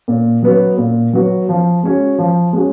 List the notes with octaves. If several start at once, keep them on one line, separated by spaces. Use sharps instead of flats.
A#2
F#3 B3 F#4
A#2
F#3 B3 F#4
F3
G#3 C#4 F#4
F3
G#3 C#4 F#4